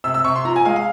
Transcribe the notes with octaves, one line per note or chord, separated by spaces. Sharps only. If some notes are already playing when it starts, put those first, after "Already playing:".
C3 E6
E6
C3 C#6
C6
F3 A#5
G#5
G#3 F5
F5